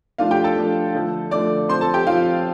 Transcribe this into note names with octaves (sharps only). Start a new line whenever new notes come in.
F3 A3 D4 F4 F5
G4 G5
A4 A5
F3 A3 D4
D3 F3 A3
D3 F3 A3 D5 D6
F3 C4 C5 C6
A4 A5
G4 G5
F3 C4 F4 F5